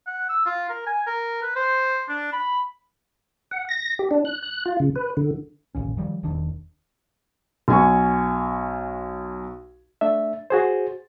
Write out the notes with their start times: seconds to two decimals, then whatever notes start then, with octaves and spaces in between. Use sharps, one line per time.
0.07 F#5
0.29 E6
0.46 F4
0.69 A#4
0.86 G#5
1.07 A#4
1.42 B4
1.56 C5
2.09 D4
2.32 B5
3.51 F#5
3.69 A#6
3.99 G4
4.11 D4
4.25 F#6
4.42 F#6
4.66 F4
4.80 C#3
4.96 B4
5.17 D3
5.75 D#1 A1 D#2 C#4
5.97 D#3 F3 G3
6.23 E1 D#2 D#3 D4
7.68 B1 G#5 C#6
10.01 A3 D4 E5
10.50 F#4 G#4 C5